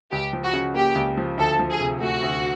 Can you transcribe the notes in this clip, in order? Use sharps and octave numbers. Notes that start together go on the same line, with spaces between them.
C#2 G4
F3
F#4
C#3
A#3 G4
C#2
F3
D2 A4
F3
G#4
C3
A3 F#4
D2